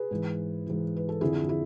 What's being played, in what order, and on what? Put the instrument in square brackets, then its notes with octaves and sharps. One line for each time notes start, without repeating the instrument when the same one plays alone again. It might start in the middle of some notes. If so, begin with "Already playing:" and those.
Already playing: [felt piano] G#4 B4
G#2 E3
G#2 E3
B4
A4
F2 D3 F3 E4 G#4
E4 G#4